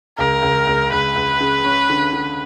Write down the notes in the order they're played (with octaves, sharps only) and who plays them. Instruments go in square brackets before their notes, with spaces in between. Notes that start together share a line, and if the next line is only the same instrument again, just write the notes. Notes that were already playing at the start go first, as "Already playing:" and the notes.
[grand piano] C#2 [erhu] A#4
[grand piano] C#2
C#2
[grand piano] C#2 [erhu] B4
[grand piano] C#2
C#3
C#4
D3
D3